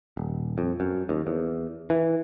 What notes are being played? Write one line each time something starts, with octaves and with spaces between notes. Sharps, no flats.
D#1
F2
F#2
D#2
E2
E3